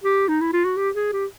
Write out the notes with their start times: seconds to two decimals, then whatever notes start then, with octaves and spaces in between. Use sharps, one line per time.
0.04 G4
0.28 D#4
0.41 E4
0.53 F4
0.65 F#4
0.77 G4
0.95 G#4
1.13 G4